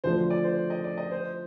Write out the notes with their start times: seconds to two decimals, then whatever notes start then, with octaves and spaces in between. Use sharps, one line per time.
0.04 D3 F3 A3 C5
0.30 D5
0.44 C5
0.70 D#5
0.84 D5
0.97 D#5
1.11 C5